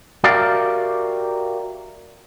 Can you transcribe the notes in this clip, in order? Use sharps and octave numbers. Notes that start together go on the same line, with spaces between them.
F#4 G4 A#4 D5 E5 F5